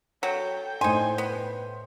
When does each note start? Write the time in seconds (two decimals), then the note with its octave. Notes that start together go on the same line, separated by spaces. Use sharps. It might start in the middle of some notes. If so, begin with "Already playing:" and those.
0.23 F#3 A4 G5
0.81 A2 D#4 C5 G#5 C6
1.18 B3